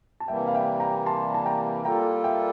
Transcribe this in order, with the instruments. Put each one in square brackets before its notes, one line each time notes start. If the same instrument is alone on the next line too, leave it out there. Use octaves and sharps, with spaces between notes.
[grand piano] A5
[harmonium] C3 E3 G3 A#3 [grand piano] E5 G5
[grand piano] F5
E5 G5
G5 A#5
A5 C6
A5
G5 A#5
[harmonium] G3 A#3 F4 A4 [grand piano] G5 A#5
[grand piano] E5 G5